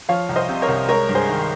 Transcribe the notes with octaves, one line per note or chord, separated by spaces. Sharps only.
F3 C#5 F5
C2
C5 D#5
C3
A#4 C#5
C2
G#3 A#4 C#5
G2
G#4 C5
D#3